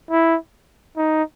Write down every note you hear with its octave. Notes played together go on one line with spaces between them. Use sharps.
E4
D#4